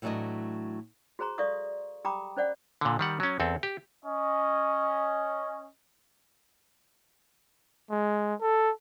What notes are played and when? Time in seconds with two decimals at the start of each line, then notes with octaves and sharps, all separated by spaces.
0.02 A2 E3 F#3 A3 D4 D#5
1.19 F#4 G#4 C5 A#5 C6
1.38 A4 D5 E5 F5 C#6 D#6
2.05 G4 G5 A#5 B5 D6 D#6
2.37 C#4 C5 D5 F#5
2.81 A#2 D3
2.99 D#3 G3 F#5
3.20 F#3 C#4
3.40 E2 C4 A4
3.63 G4
4.05 C#4 D#5
7.91 G#3
8.41 A4